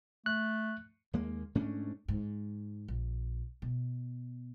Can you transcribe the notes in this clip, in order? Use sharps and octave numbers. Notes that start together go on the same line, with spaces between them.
A3 F#6
D#2 G#3 A#3
G#2 A3 C#4 D4
G#2
A#1
B2